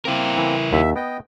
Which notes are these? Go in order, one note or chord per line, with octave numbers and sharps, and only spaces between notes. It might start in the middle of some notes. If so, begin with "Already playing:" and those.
A#3 C4 E4 A#4
E3
D#2 E5
B3 D#5 G5